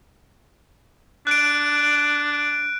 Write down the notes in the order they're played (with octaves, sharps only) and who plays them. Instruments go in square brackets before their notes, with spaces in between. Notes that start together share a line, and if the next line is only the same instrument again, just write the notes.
[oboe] D4 [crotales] F#6 D7